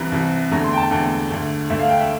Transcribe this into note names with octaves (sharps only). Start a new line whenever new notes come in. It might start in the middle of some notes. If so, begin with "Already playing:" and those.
Already playing: C2 C3 E3 A#5
C2 C3 E3
E2 D3 A3 A#5
C6
G5
A5
E2 D3 A3 G5
D2 D3 A3
D2 D3 A3 E5
F5
G5
E5